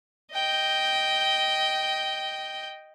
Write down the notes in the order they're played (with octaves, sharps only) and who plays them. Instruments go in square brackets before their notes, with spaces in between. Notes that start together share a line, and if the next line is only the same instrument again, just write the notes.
[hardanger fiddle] D#5 G5